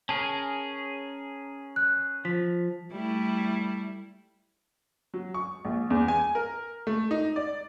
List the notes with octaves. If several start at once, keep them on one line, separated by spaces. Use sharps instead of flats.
C#4 G#4 A#4 A5
F#6
F3 B6
G3 A3 E4
F#3
C#6
A#1
E2
G#5
A#4
A3
D#4
D5